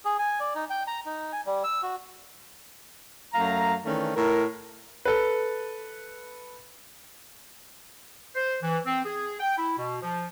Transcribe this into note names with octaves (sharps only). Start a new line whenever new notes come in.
G#4
G#5
D5
D#4
G5
A#5
D#4
G#5
G3
E6
F#4
F#2 A3 F5 A#5
D#3 E3 A3 C#4 D4
A2 E4 A#4
A4 B4
C5
E3
C4
G#4
G5
E4
B2
F3